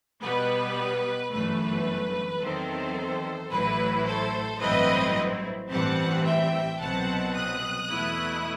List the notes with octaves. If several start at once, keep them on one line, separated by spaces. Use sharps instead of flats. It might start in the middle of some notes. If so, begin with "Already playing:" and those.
B2 G3 B3 B4
G1 F#2 E3 A3 B4
E2 D#3 F#3 C4 A4 C5
A1 A2 F#3 A3 E4 B4
A4 C5
A1 G2 F#3 C4 E4 B4 D#5
A1 G2 E3 G3 C4 F#5 A5
E5 G5
C2 B2 F#3 C4 F#5 A5
D#6 F#6
E2 B2 A3 E4